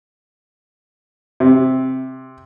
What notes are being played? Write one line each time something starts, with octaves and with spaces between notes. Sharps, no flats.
C3